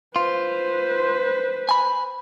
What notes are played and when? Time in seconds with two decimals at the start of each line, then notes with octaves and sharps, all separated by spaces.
0.16 F4 B4 C5
1.69 G#5 B5